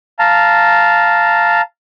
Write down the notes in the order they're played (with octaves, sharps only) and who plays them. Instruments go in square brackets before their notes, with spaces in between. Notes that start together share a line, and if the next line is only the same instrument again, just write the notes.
[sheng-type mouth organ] F5 A5 A#5